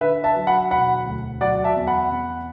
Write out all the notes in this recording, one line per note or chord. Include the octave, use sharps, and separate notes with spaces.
D3 B4 E5
E5 A5
F#3
F#5 B5
E1 F#5 B5
D2
F#3 D5 F#5
E5 A5
E2
F#5 B5
E2